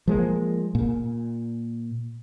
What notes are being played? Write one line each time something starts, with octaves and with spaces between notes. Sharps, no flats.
F3 G#3 A#3
A#2